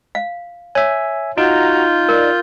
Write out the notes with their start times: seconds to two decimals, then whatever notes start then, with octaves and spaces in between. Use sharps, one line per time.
0.15 F5
0.75 C#5 E5 G#5
1.38 D#4 F4 F#4 A#5 G6
2.09 A#4 D5